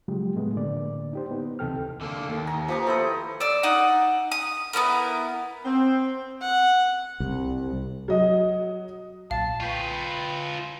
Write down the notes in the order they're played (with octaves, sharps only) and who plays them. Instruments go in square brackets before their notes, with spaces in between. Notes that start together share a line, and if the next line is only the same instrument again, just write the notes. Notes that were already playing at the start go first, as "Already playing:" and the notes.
[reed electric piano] C#3 F3 F#3 G#3 A#3 G4
A2 G#3 A3 B3
A2 D3 A#3 D5
D#4 G4 C5
B3 D#4
D2 C3 E3 A4 G5 F6
[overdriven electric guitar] D3 A#3
D#2
[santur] A#5
[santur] F3 G4 A#5 [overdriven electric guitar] B3
[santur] A3 E4 D#5
[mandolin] D5 E6
D#4 F#5
D#6
B3 C#4 E4 A#4
[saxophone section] C4
[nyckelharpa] F#5
[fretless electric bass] C2
[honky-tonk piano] F#3 D#5
[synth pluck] B1 A#2 [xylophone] F5 [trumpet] A5
[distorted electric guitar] F4 B4 [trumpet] G5 [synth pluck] B5 C#6 G6